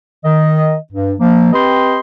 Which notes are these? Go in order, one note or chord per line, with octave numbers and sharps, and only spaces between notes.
D#3 D#5
G2
F3 A#3
C4 G4 B4 D#5 G5 C6